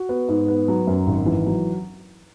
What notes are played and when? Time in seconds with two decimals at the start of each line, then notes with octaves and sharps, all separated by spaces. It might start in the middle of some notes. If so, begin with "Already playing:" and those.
Already playing: F#4
0.09 B3
0.28 G#2
0.48 B3
0.68 F#3
0.87 F#2
1.06 G#1
1.26 E3
1.46 F#3